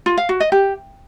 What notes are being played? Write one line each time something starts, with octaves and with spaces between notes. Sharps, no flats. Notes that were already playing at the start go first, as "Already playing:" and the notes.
F4
F5
F#4
D#5
G4